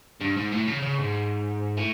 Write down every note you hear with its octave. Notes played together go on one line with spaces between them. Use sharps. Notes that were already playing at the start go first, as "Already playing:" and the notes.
G2
G#2
A2
C#3
C#3
G#2
A2